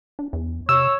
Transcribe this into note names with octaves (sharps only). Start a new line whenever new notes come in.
D4
E2
C3 C#5 E6